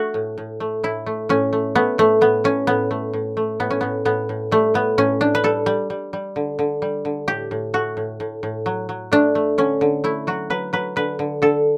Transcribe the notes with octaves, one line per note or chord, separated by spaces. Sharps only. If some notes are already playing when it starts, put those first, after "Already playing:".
Already playing: A3 F#4 A4
A2
A2
A3
A2 E4
A3
A2 C#4
A3
A3 B3
A2 A3
A2 B3
A2 C#4
A2 B3
A3
A2
A3
A2 B3
C#4
A2 B3
A2 B3
A2
G3 A3
A2 B3
A2 C#4
A2 D4
B4
G3 A4
G3
G3
G3
D3
D3
G3
D3
A2 G4
A2
A3 F#4
A2
A2
A2
F#3
F#3
A3 D4
A3
D3 C#4
D3
A3 E4
F#3 F#4
F#3 B4
F#3 B4
D3 B4
D3
D3 A4